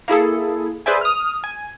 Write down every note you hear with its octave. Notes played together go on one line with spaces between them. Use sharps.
A#3 E4 G#4 A4
G#4 B4 C5 D5 E5 G#5
D#6 F6
G#5